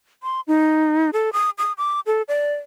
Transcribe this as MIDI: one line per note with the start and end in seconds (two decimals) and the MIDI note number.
0.23 0.41 84
0.47 1.11 63
1.13 1.33 69
1.33 1.50 87
1.58 1.73 87
1.78 2.00 86
2.07 2.22 69
2.28 2.53 74